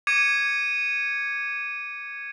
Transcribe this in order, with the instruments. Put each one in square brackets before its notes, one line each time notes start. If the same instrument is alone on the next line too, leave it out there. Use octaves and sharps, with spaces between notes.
[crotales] D6 G#6 C#7 D#7